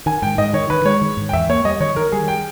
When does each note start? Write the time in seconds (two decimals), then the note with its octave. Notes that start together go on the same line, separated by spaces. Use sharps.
0.06 D#3 G#5
0.22 G#2 G5
0.38 G#2 D#5
0.53 D#3 C#5
0.70 D#3 B4
0.85 G#3 C#5
1.01 D#3
1.17 G#2
1.29 G5
1.33 E2 E5
1.49 A#3 C#5
1.65 G3 D#5
1.80 D#3 C#5
1.96 D#3 A#4
2.12 G3 G#4
2.28 G5